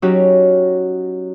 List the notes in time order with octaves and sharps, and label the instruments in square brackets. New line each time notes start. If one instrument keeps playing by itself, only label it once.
[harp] F#3 C#4 D#4 F#4 G4